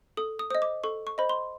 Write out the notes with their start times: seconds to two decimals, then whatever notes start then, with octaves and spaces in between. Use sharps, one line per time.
0.17 A4 D#6
0.39 D#6
0.50 C5 D#5 D#6
0.62 D6
0.84 A4 C#6
1.07 C#6
1.18 C5 D#5 B5
1.29 C6